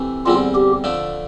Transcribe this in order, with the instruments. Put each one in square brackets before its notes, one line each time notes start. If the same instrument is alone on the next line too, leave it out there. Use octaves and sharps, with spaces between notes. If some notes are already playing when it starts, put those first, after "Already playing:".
Already playing: [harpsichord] C3 E3 A3
[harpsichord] E2 D3 G3 C4 [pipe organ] F4
[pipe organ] G4
[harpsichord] D3 F3 A3 D4